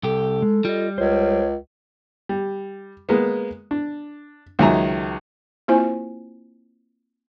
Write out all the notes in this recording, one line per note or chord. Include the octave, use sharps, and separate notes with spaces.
C2 G4 A4
G#3
G3 F4 D#5
C#2 A#4 C5 C#5
G3
G#3 A#3 B3
D4
C#2 D#3 F#3 E5 G#5 A#5
A#3 C4 E4 F4 C5 G#5